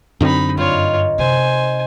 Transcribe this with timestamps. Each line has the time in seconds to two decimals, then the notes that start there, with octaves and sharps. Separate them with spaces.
0.21 F#2 D3 C4 D#4 B5
0.57 G2 D#3 D#4 F4 C#5
1.18 C3 C5 G#5